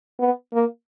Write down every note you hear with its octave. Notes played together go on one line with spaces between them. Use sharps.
B3
A#3